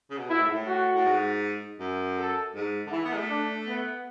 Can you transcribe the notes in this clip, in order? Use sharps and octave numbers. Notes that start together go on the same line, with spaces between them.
C#3
B2
B2 E4
A2
G#2
A2
F#4
A2
G#2
F#2
A4
G#2
D3
E3 E4
B3
G#3
A3
D4
B3